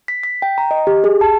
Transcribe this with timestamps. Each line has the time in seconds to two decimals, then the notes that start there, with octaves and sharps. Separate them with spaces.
0.08 B6
0.23 B6
0.42 G5
0.58 A#5
0.71 D#5
0.87 G4
1.04 G#4
1.21 A5